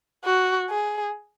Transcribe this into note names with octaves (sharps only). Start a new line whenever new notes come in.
F#4
G#4